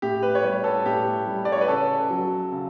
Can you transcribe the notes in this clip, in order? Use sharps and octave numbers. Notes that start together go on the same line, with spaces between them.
A2 G4
B4
C#5
G3 B4
A4
A2 G4
G3
D5
C#5
B4
C#3 A4
F#3
C#3